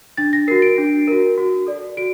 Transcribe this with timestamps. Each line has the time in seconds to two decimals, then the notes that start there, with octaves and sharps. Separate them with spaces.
0.17 D4 A6
0.33 A#6
0.48 F#4 A#4 C7
0.62 D7
0.78 D4
1.07 F#4 A#4
1.38 F#4
1.67 A4 D5
1.97 F#4 D7